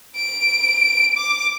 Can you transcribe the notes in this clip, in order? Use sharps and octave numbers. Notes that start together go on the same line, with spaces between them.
D7
D6